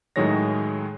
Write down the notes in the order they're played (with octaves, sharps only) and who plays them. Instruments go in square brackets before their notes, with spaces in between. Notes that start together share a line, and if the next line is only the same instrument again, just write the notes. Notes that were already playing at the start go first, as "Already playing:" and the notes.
[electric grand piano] A2 D#3 F#3 G#3 C#5 A#6